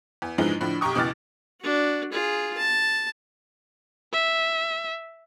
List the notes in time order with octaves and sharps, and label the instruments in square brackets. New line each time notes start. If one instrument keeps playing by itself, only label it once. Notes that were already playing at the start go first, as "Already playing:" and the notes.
[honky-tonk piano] E2
G#2 D3 E3 F3 G#3
A2 D3 F3
B1 G4 G5 A#5 C#6 D#6
C#2 B2 E3 D6 F6 A6
[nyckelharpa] D4 F#4
F4 G#4
A5
[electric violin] E5